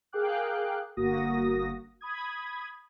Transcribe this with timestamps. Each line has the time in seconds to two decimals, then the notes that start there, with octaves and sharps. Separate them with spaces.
0.13 G#4 A#4 F5 G5 D6 F#6
0.97 G1 A#3 F#4 D#6 A#6
2.01 B5 D#6 G#6